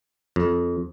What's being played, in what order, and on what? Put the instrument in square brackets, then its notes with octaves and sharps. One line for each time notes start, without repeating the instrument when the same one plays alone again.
[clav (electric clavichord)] F2